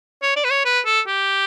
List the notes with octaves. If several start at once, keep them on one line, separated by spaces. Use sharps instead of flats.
C#5
D5
B4
C#5
B4
A4
G4